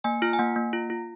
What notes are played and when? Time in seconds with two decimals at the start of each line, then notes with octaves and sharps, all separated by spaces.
0.04 A#3 G#5
0.22 F4 F6
0.33 G#5
0.39 A#3 F#5
0.56 A#3
0.73 F4
0.90 F4